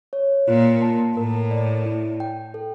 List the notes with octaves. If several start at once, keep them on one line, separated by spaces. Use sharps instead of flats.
C#5
A#2 F4
A5
A2 A#4
D5
E4
G5
A4